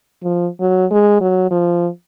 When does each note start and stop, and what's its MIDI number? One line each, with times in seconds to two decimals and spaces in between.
0.23 0.48 53
0.60 0.85 54
0.91 1.19 56
1.21 1.50 54
1.51 1.88 53